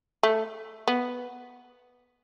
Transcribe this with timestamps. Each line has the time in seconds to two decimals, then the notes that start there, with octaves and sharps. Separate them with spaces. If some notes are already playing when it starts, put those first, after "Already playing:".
0.23 A3
0.88 B3